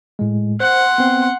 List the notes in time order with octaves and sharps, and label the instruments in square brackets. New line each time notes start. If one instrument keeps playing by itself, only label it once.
[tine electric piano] A2 G#3
[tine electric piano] C5 [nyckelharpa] F#5 C6
[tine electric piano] B3 C4